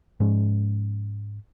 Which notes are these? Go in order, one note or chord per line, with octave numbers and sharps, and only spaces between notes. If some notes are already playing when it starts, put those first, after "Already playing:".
G#2 F3 G#3 C#4